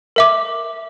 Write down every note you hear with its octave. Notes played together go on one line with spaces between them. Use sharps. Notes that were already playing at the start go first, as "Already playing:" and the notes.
A#4 E5 D6